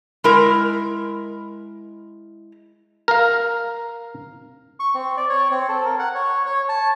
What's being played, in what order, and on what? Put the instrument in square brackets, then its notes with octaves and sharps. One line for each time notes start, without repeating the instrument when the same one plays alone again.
[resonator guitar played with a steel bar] G#3 E4 A#4
[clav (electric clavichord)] A#4 F5
[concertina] C#6
C4
D5
C#5
C4
A4
A#4
F#5
C#5
C#5
A5